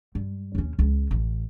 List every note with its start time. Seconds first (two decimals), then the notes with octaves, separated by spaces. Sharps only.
0.15 G2
0.55 D#2 C#4
0.79 C#2
1.11 A1